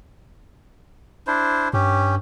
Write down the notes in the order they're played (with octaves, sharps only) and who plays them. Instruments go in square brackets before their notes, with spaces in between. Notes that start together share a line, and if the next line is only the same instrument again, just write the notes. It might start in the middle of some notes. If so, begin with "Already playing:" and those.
[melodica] D4 E4 C5
[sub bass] G2 [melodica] C#4 G4